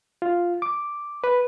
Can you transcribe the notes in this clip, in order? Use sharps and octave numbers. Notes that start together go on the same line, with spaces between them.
F4
D6
B4